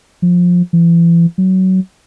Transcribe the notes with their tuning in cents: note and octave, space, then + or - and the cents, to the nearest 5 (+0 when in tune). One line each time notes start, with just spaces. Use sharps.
F3 +20
E3 +40
F#3 +20